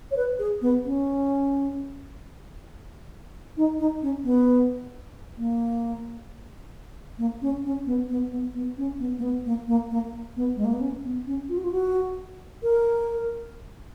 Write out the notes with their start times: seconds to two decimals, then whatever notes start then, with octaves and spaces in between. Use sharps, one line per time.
0.11 C#5
0.16 B4
0.39 G#4
0.62 B3
0.85 C#4
3.57 D#4
3.79 D#4
4.02 C#4
4.24 B3
5.38 A#3
7.18 A#3
7.42 C#4
7.65 C#4
7.86 B3
8.09 B3
8.32 B3
8.55 B3
8.77 C#4
8.99 B3
9.19 A#3
9.22 B3
9.45 A#3
9.68 A#3
9.91 A#3
10.36 B3
10.56 G#3
10.64 A#3
10.73 B3
10.81 C#4
11.04 B3
11.27 C#4
11.49 F4
11.57 F#4
11.64 F4
11.72 F#4
12.63 A#4